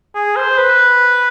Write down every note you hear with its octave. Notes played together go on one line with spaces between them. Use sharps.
G#4
C5
B4